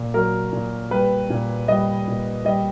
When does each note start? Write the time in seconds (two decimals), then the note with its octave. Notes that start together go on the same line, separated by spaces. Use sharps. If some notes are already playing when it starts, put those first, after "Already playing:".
Already playing: A#2
0.14 F#3 A#4
0.53 A#2
0.91 G3 B4
1.30 A#2
1.68 G3 D#5
2.08 A#2
2.45 G3 D#5